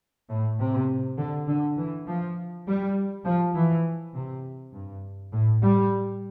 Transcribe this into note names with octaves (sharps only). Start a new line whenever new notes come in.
A2
C3
D3
D3
E3
F3
G3
F3
E3
C3
G2
A2
G3